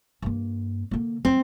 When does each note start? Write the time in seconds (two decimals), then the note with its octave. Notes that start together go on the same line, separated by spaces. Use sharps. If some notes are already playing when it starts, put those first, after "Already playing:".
0.22 G2 A#3
0.91 D3 A#3
1.25 F#3 C4